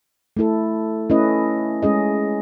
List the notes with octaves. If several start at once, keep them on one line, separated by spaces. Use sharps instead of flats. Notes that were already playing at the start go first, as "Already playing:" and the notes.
A3 E4 A4
A3 C#4 E4 B4 D#5
G#3 C#4 G#4 D#5